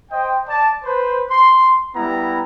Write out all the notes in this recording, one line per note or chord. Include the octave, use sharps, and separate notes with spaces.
C5 D#5 G5
D5 A5
B4 C5
C6
G3 B3 E4 A#5